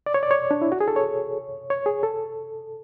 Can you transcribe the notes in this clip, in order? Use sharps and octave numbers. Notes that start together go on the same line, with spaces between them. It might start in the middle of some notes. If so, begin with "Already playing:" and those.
D5
C#5
D5
C#5
D4
E4
F#4
G#4
A4
C#5
C#5
G#4
A4